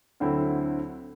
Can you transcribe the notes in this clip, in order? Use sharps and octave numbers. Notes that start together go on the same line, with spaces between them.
D2 D3 F#3 C4 E4